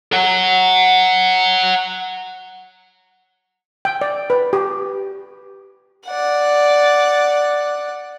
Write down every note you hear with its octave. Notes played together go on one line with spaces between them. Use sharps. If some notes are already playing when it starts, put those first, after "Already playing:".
C#5 F#5
G5
D5
B4
G4
D5 F#5